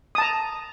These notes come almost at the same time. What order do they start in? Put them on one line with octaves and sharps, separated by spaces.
D#6 A5 A#5